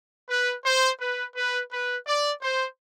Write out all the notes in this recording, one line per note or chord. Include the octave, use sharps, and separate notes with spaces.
B4
C5
B4
B4
B4
D5
C5